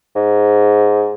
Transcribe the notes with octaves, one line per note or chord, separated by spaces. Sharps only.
G#2